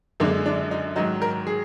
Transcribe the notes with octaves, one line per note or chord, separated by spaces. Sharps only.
F#2 D3 G#3 A#3
D4
D#4
G#2 D#3 F#3 D#4
A#4
G#4